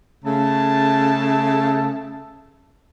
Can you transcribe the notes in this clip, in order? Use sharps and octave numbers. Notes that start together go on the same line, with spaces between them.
C#3 A3 A5